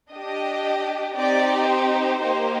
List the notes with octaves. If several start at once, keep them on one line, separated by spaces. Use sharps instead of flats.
D4 G4 D#5
C4 D#4 G4 D5
C5
A#3 D#4 G4